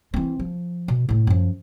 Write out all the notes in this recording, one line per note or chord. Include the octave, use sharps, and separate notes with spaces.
E3 C4
F3
B2
A2 A3
F#2 F3